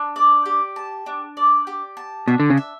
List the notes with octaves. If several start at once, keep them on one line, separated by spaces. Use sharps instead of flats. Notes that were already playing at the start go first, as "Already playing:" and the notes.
Already playing: D4 A5
D5
G4
A5
D4
D5
G4
A5
B2 D4
D3
C#3
E5